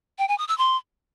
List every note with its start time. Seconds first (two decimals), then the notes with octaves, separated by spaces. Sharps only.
0.18 G5
0.28 G#5
0.38 D#6
0.48 E6
0.58 C6